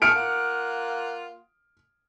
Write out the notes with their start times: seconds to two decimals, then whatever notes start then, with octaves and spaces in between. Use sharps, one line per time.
0.02 A3 G#4 A4 F6 C#7 D7
0.15 A#3 F4 F#5